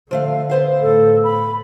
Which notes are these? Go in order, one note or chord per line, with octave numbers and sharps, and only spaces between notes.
D3 F3 A3 F5
B3 C5 F5
A2 A4
B5